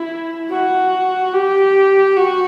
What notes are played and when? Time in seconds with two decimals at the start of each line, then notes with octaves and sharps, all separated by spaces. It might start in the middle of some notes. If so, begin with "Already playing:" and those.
Already playing: E4
0.50 F#4
1.33 G4
2.16 F#4